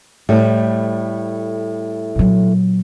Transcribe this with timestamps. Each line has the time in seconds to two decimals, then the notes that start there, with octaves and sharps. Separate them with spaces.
0.29 A2 G3 A3
2.16 A#2 F#3